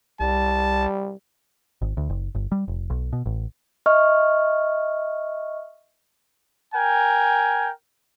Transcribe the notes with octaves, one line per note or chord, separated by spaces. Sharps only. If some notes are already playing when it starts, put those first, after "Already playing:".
C2 G3 A5
G#1
D2
F#1
G1
G3
F1
B1
B2
A1
D#5 E5 C#6 F6
A#4 G5 G#5